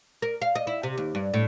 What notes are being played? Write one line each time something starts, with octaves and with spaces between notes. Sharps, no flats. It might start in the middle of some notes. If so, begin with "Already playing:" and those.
A#4
F5
D#5
E4
C3
D#2
G2
A2